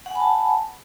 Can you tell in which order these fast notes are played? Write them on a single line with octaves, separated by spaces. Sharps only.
F#5 G#5 B5 A5